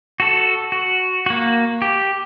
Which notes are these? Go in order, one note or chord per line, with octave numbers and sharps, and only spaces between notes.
F#4 A4
F#4
A#3 F#4
G4